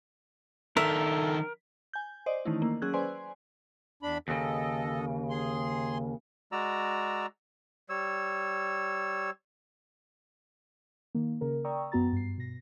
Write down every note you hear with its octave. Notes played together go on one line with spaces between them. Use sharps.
D#3 D4 A4 A#4 E5
G#5 G6
C5 D5 D#5
D#3 E3 A3 C#4 D#4 E4
A#3
F#3 C#4 G#4 E6 F#6 G#6
B4 C5 D5 G#5 C6
E2 D4 B5
D#2 C#3 A4 D#5
G#4 C6
G#3 F#4 D5 A#5 E6
G3 C#5 E6
D#3 A#3
C#3 A#4
D5 G5 A#5 C#6 D#6 E6
F#2 B3 F#4 A#5 A6
G2 C7
B2 A#6